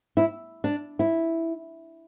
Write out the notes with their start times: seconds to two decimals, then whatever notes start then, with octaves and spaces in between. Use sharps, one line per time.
0.17 E4
0.64 D4
0.99 E4